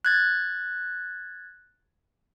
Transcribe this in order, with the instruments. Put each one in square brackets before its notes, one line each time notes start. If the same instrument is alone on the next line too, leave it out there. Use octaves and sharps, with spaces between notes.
[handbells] F#6 G#6 A6